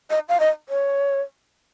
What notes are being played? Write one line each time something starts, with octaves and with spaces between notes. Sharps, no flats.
D#5
F5
D#5
C#5